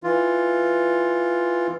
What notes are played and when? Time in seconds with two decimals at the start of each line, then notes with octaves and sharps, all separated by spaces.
0.04 E3 F4